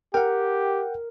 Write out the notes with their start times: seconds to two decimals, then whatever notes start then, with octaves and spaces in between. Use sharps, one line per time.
0.14 G4 A#4 F#5 G5